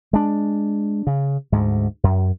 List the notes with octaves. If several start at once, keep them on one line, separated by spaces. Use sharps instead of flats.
G#3 D4
C#3
D2 G#2
F#2